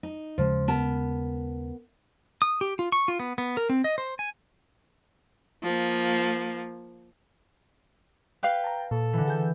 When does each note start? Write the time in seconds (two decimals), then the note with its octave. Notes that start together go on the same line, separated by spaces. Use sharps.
0.03 D#4
0.38 D#2 C#3 F3 G#3
0.68 B3 A#4 A5
2.42 D#6
2.61 G4
2.79 F4
2.92 C#6
3.08 F4
3.20 B3
3.38 B3
3.57 A#4
3.69 C4
3.84 D#5
3.98 C5
4.19 G#5
5.63 F3 A#3
8.43 B4 F5 G5
8.64 A5 A#5
8.91 A#2 A4
9.13 D3 E3
9.28 G#4 G6